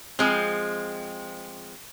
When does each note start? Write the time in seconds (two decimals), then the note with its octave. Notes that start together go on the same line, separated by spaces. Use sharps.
0.19 F3 G#3 C4